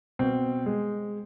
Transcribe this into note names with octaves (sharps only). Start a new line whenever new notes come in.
B2 C4
G#3